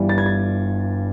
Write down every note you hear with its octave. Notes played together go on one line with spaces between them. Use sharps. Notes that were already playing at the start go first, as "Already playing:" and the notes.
Already playing: G1 G2 E3 G3
A6
G#6
A6